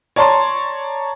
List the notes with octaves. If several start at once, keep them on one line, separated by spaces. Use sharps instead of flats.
C#5 D5 A5 A#5 C6